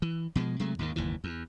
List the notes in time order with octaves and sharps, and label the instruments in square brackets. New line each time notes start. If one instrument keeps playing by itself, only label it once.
[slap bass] E3
B2 F3 F#3 G#3
C3 F#3 G#3 A3
D#2 G#2 D#3
F#1 D#2 G#2 E3
E2